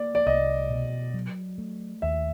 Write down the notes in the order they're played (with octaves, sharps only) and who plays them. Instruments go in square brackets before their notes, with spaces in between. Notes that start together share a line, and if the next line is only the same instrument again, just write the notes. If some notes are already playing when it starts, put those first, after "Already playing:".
Already playing: [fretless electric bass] A#3 [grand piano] D5
[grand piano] D5
[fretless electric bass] C2 [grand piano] D#5
[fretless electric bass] B2
F#3
A3
[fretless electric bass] D#2 [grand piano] E5